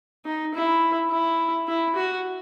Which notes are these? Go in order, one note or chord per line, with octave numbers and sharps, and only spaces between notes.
D#4
E4
E4
E4
F#4